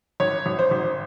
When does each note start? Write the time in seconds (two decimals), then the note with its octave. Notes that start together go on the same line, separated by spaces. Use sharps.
0.20 G#1 C#5
0.46 G#1
0.59 C5
0.71 G#1